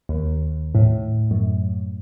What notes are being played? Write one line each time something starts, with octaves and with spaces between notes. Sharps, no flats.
D#2
A2
F#2